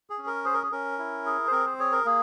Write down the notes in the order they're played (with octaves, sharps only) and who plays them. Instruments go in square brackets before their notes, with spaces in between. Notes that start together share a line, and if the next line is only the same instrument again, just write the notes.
[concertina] G#4
C#4
A#4
G#4 C5
A#4
G#4
C#4 A#4
E4
G#4
C5
C4 A#4
C5
G#4 C#5
A#4
A#3 G#4